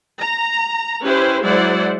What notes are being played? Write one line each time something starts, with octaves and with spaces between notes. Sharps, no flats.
A#5
C#4 E4 G4 B4 C5
F#3 G#3 E4 C5 D5 F#5